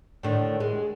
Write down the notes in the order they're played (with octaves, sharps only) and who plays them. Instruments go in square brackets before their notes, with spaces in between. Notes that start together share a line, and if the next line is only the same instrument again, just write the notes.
[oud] A2 D3 D#3
G#3